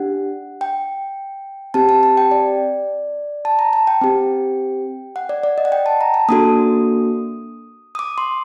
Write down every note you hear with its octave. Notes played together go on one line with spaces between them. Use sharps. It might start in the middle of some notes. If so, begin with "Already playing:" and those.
Already playing: D4 G4 F#5
G5
C4 G4 A5
A5
A5
G5
D5
A5
A#5
A5
G5
C4 G4
F#5
D5
D5
D#5
F#5
G5
A5
A#5
A5
A#3 D4 F#4 A4 D#6
D#6
D6
C6